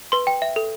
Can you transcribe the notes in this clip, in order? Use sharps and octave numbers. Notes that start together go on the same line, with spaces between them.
B4 C6
G5
E5
A4